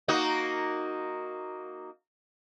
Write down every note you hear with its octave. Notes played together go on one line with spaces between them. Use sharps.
A#3 D#4 F#4